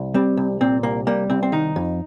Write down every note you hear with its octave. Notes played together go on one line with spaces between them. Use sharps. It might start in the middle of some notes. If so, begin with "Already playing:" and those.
Already playing: C2
G3 C4
C2
A#2 C4
C2 A#3
G3 A#3
C2 C4
C4
D#3 D#4
F2